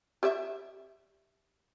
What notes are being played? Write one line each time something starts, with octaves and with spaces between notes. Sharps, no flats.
G4 D5 E5